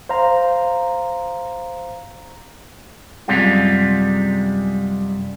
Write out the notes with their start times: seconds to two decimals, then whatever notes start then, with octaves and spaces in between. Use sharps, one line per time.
0.09 C5 F5 A#5
3.28 F#2 C3 G3 G#3 F4